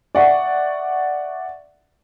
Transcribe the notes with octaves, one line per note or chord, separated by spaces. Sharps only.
D5 E5 F#5 C#6